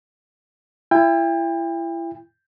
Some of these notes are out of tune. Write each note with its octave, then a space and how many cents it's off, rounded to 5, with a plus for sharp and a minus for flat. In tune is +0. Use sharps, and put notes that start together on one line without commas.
E4 +30 G5 +35